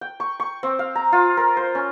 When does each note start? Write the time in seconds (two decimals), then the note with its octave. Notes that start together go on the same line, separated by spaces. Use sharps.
0.01 G5
0.20 C#6
0.40 C#6
0.63 C4
0.79 F5
0.95 A#5
1.12 F4
1.37 A#4
1.57 C5
1.75 C#4